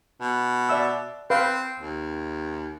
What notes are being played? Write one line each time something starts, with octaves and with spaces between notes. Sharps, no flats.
B2
D5 E5 E6
C4 B4 F5
D#2